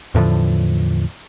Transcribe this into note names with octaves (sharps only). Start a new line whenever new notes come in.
E2 A2 D3 F3